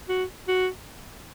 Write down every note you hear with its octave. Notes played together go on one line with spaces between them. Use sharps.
F#4
F#4